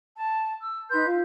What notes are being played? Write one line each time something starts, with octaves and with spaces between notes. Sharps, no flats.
A5
E6
D#4 B4 C6 G6
F4